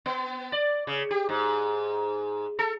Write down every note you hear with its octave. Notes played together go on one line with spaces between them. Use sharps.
B3
D5
C#3
G4
G#2
A4